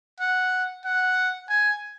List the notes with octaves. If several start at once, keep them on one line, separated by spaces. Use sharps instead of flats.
F#5
F#5
G#5